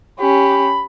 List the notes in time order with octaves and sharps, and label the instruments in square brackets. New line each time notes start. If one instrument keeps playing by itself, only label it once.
[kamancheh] C#4 G4 [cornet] B5